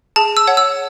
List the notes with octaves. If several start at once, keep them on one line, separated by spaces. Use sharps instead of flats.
G#4 A5
E6
C#5 F#5
E6